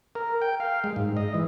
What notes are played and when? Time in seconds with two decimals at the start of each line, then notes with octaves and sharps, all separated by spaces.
0.15 A#4
0.42 G5
0.60 F5
0.84 G#3
0.96 G#2
1.17 D#5
1.34 E3